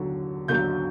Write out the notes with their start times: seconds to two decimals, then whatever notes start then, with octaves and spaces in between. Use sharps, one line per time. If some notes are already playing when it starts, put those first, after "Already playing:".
Already playing: D#2 D3 F#3
0.48 D#2 D3 F#3 G6